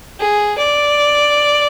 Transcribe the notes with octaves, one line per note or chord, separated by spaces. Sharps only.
G#4
D5